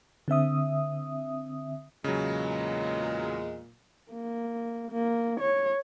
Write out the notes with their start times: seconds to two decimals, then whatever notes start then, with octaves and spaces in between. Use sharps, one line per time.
0.28 D3 C4 E5 D#6
2.04 E2 A#2 C#3 F#3 G#3
4.12 A#3
4.91 A#3
5.41 C#5